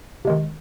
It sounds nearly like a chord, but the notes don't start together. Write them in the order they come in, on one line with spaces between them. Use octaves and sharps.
C3 G#3 D#3